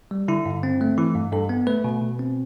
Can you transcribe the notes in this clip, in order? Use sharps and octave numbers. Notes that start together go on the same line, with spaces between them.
G3
D3 E4
G2
C4
A3
E3 E4
G2
G2 A4
B3
A3 B4
B2
B2
C4